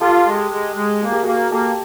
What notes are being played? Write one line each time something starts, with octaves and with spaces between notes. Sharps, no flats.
F4 G4 A4
G#3
G#3
G#3
A#3 G#4
G4
A#3 F#4 G#4
A#3 G4 A4